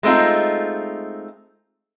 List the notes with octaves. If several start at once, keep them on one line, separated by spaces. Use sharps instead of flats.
G#3 A3 C4 D#4 F4